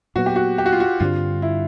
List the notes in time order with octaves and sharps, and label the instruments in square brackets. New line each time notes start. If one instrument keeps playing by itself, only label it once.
[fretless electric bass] A#2 F#3 B3 [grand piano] F#4
[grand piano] G4
F#4
G4
F#4
F4
F#4
[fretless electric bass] G2 D3 G3 C4 [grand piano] F4
[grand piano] E4